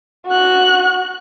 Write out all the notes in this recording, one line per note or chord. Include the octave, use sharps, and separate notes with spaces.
F#4 F#6